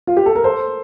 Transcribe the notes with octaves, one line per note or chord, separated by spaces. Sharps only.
F4
G4
A4
A#4
A4 C5